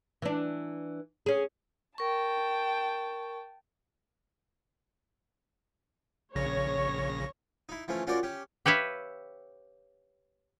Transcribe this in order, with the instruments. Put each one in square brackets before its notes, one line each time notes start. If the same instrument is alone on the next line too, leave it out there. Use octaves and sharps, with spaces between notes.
[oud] E3 D4
C#4 G#4
[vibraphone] A#4 C#6 [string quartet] G5 A5
[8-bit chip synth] A#1 C#3 A#6 [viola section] C#5
[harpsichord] D#4 E4
E3 F3 A3 C#4
C#4 F4 F#4 A#4 C5 D5
C#4 G4
[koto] G4 B4 C#5 E5 F5